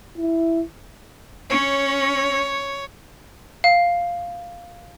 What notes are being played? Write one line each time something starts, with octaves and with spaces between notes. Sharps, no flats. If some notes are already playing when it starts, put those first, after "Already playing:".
E4
C#4 C#5
F5